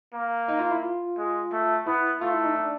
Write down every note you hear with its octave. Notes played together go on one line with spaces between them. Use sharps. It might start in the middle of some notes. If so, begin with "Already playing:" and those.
A#3
D#4
F4
E4
F4
G#3
A3
B3 E4
A3 F4
E4
D#4
D4